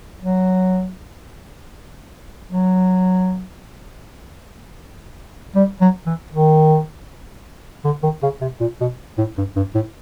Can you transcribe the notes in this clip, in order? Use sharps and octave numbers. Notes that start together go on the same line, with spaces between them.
F#3
F#3
G3
F#3
E3
D#3
D3
D#3
C#3
C3
A#2
B2
A2
G2
G2
A2